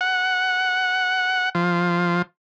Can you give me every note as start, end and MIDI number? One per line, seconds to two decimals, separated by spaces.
0.01 1.49 78
1.55 2.22 53